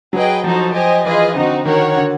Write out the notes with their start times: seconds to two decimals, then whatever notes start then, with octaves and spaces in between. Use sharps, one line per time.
0.13 F#3 G#4 B4 D#5 G5
0.44 F3 D#4 F#4 A4 C5
0.74 G4 C5 D#5 G#5
1.05 E3 F4 G#4 B4 D#5
1.35 D3 C4 D#4 F#4
1.66 D#3 F#4 A#4 C#5 F#5
1.96 D3